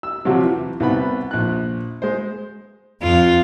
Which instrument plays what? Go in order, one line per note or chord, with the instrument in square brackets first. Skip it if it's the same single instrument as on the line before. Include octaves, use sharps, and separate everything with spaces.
[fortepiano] E6
C3 F3 F#3 G4
E3
C2 B3 B5
A#1 F#6
G#3 C5
[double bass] F2 [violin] F4